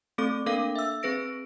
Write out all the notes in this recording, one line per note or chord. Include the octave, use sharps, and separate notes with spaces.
A3 C4 A4 D6
A#3 D4 A4 A#4 F5 D6
E5 E6
C4 G#4 B4 A#6 D7